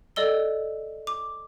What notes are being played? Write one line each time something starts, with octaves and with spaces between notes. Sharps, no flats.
A4 D5 D#5 E6 G7
D6